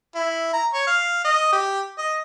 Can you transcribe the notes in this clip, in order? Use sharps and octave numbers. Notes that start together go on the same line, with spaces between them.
E4
A#5
C#5
F5
D#5
G4
D#5